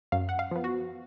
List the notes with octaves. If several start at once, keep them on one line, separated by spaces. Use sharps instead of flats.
F#2 F5
F#5
F5
F3 B3
F#4